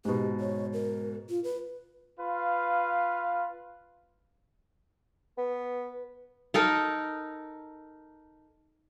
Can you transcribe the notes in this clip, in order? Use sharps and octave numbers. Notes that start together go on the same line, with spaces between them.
G#2 B2 G4
C#5
A#4
F4
B4
F4 B4 F5
B3 B4
D#4 A4 A#4